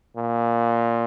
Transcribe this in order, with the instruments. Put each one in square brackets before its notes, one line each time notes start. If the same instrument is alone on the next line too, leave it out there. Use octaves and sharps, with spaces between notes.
[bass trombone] A#2